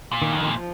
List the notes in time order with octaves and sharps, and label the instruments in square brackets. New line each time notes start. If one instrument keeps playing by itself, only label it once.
[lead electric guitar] A#2
[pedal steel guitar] D#3
[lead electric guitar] F2
[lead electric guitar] A#2 [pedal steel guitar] D#3
[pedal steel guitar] F3